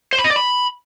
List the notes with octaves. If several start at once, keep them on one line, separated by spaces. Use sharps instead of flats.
C5
B5
D#5
D5
B5